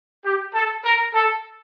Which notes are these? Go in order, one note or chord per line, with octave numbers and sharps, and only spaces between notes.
G4
A4
A#4
A4